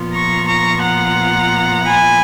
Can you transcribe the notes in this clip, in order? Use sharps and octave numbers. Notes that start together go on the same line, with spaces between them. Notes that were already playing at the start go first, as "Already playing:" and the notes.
Already playing: A#2 F3 B3 F4
A#5 C#6
A#5 C#6
F#5 A#5
G#5 B5